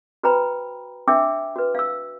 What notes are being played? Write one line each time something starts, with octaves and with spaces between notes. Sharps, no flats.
F#4 B4 C5 G5 A#5 B5
D4 E5 G5 D6 E6
F#4 B4
F5 E6